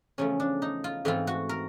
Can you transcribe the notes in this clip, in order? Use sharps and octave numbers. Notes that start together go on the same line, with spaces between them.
E2 C#3 F3 A3 C#4
D4
D#4
F4
G#2 E3 A3 C4 F4
F#4
A#4